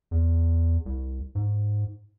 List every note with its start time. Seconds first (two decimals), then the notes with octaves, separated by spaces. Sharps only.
0.11 E2
0.86 C2
1.35 G#2